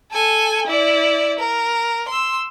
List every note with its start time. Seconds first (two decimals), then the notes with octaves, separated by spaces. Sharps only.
0.12 A4 G#5
0.67 E4 D5
1.39 A#4
2.08 C6 E6